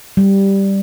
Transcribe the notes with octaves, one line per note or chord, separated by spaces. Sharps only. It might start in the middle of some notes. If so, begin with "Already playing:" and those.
G3